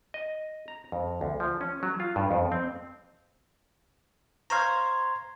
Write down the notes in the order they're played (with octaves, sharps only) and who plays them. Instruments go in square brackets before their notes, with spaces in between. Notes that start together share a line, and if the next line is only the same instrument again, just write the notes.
[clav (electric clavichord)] D#5
A#5
F2
D2
F3
C#4
F#3
F4
G2
F2
C4
[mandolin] C5 C#5 F5 [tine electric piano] A#5 G#6